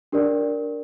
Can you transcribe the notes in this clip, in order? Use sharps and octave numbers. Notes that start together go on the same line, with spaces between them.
D4 G4 A#4 D5